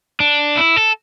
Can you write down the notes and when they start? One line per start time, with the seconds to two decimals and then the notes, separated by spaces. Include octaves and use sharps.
0.20 D4
0.57 E4
0.76 A4